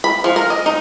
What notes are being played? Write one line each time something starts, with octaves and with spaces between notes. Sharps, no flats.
B5
F3
A#4
D#5
D#4